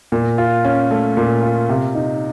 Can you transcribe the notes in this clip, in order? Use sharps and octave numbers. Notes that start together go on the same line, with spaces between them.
A#2
F4
C#4
A3
A#2
F4
C3
D#4